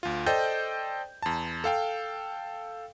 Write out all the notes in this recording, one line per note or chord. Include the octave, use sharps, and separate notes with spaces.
D2 F4
A4 C5 D5 D#5 G5 G6
E2 A5
A4 F5 G5